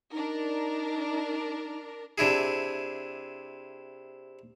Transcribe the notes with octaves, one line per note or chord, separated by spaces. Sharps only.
D4 D#4 A#4
C3 D4 E4 G#4